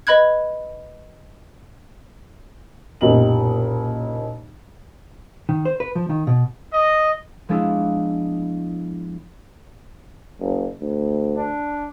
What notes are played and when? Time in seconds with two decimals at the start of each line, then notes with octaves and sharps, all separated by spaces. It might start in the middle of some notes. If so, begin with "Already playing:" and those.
0.07 B4 D#5 B5 F#6 G#6
3.01 F#1 B1 A#2 G4 D#5 F#7
5.49 D#3
5.65 C5
5.80 B4
5.95 F3
6.10 D#3
6.27 B2
6.72 D#5
7.49 F3 G#3 B3 D4 E4
10.40 F#1
10.81 D2
11.37 D4